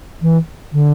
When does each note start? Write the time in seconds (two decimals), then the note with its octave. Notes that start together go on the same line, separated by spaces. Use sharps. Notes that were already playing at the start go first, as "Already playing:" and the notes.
0.22 E3
0.73 D3